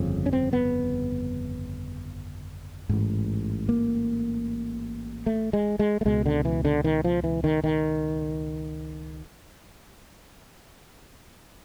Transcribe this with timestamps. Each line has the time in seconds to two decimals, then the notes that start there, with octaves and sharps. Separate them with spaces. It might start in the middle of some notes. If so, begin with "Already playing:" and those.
Already playing: G1 F2 C#3
0.26 C#4
0.33 C4
0.53 B3
2.89 A1 G#2
3.69 A#3
5.26 A3
5.53 G#3
5.79 G#3
6.01 A3
6.05 C#2 B2 G#3
6.26 D3
6.45 E3
6.65 D3
6.84 D#3
7.04 F3
7.24 E3
7.44 D#3
7.64 D#3